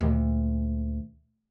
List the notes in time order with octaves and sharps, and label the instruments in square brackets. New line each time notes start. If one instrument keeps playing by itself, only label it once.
[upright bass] D2 A#2